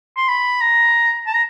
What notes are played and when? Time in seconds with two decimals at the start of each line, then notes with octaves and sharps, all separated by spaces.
0.17 C6
0.28 B5
0.61 A#5
1.27 A5
1.35 A#5